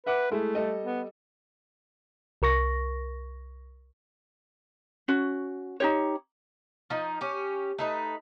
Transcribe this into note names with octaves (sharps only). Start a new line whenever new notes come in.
B4 E5 F#5 D6
G#3 A3 E4 G#4
G3 A4 D#5
B3
C2 A#4 C#6 A#6
C#4 F#4
D#4 G4 C#5
F3 D#4
C#4 G4
A3 D#4 B4